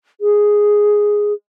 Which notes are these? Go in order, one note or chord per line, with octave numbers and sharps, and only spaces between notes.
G#4